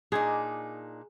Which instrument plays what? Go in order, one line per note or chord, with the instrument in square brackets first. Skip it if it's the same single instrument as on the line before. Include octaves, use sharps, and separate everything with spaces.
[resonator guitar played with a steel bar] A#2 D4 D#4 [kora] G#4